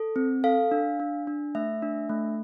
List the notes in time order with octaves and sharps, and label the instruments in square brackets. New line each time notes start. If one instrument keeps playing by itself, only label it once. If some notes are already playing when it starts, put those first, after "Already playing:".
Already playing: [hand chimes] A4
C4
A4 F5
D4
D4
D4
A3 E5
D4
A3